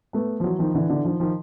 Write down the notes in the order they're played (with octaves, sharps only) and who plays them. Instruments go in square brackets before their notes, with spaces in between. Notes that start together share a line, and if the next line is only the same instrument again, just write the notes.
[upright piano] A3 B3
F3
E3 F#3
D#3 F3
D3 E3
D3 E3
D#3 F3
D#3 F3